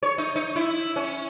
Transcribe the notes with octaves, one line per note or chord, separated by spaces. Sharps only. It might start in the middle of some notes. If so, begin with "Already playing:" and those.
C#5
D#4
D#4
E4
C#4